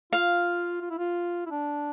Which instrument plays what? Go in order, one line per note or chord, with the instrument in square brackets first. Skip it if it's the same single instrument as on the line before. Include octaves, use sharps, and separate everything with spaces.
[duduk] F4 [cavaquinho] F5
[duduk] F4
E4
F4
E4
D4